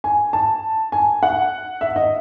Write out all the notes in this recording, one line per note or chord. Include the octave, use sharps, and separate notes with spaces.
G#5
A5
G#5
F#5
E5
D#5